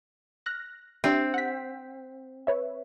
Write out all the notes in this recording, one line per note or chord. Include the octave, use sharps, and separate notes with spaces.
F6 F#6 A#6
C4 D4 G4 E5
F#5 B6
B4 C#5 E5